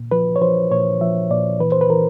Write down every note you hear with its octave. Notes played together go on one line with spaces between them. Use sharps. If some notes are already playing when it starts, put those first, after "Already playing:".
Already playing: A#2
F3 B4
C#5
F3 C5
A#2 C#5
F3 E5
A#2 D5
E3 B4
C5
B4
E3 A#4